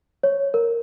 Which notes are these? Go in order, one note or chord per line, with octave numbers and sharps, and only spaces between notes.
C#5
A#4